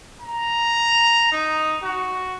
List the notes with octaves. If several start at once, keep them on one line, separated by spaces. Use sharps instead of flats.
A#5
D#4
F#4